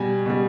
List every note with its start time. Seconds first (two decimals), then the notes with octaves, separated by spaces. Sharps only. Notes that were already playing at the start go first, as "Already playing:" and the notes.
Already playing: B2 G3 G#5
0.26 B2 G3